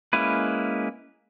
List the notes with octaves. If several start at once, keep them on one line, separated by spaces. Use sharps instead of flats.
G#3 A#3 C#4 E4 B4